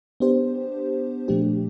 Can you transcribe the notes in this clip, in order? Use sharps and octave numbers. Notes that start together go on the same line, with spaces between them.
B3 D4 G4 C5
A#2 F3 A3 D4 G4